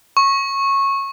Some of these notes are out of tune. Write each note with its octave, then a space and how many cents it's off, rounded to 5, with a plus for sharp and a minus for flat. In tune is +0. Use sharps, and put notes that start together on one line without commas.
C#6 -15